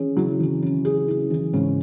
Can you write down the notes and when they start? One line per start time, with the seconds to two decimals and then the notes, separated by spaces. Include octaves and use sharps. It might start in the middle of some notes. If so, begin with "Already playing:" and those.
Already playing: E3 C#4 G#4
0.17 C#3 F#3 E4
0.40 E3
0.62 C#4
0.85 G#4
1.08 E4
1.30 E3
1.53 G#2 C#3 C#4